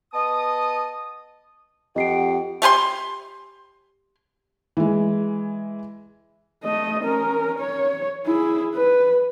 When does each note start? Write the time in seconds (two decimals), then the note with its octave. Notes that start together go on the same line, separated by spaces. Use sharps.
0.13 B3 D#5 A5 D#6
1.96 F2 G4 D#5 F#5 C7 D7
2.62 A3 G4 G#5 C6
4.77 E3 G#3
6.65 A3 D#5
7.03 C#4 A#4
7.59 C#5
8.26 E4 G#4
8.75 B4